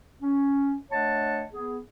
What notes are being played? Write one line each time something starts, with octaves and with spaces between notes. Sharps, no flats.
C#4
A3 D4 C#5 D#5 F#5 A5
B3 G#4